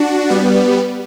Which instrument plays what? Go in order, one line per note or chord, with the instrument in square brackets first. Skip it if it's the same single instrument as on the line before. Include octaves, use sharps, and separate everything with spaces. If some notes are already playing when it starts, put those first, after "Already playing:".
Already playing: [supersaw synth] D4 F#4
G3 B3